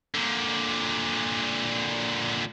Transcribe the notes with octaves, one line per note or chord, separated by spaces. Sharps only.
A#2 D3